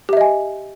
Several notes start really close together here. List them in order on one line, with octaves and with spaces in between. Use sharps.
G4 E5 D#5 G#5